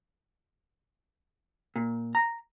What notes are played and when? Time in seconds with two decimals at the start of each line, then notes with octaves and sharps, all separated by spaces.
1.76 A#2
2.15 A#5